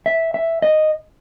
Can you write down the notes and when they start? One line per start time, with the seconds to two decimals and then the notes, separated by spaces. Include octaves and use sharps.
0.06 E5
0.34 E5
0.62 D#5